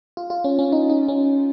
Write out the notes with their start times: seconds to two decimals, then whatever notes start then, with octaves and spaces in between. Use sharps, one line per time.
0.17 F4
0.30 F4
0.44 C#4
0.59 C#4
0.72 D#4
0.90 D#4
1.08 C#4